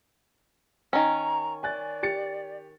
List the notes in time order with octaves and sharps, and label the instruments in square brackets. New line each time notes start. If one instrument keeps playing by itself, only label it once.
[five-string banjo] D#3 C#4 [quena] A#5
[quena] D5 [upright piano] G#5 F#6 A6
[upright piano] G4 A6 C#7